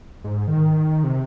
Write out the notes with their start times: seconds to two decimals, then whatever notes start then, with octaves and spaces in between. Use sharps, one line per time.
0.24 G#2
0.48 D#3
1.04 C3